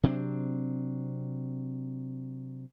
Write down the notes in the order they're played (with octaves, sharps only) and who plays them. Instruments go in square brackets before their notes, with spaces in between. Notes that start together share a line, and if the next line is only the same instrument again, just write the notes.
[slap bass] C3 F#3 C4 D4